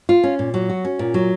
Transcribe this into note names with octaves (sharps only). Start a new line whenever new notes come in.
F4
C#4
A#2
F#3
F#4
C#4
A#2
F#3